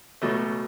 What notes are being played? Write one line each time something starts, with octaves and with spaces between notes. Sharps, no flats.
C#2 B2 F#3 A3